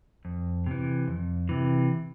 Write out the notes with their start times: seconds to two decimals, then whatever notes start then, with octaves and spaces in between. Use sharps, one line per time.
0.25 F2
0.66 C3 E3
1.08 F2
1.49 C3 E3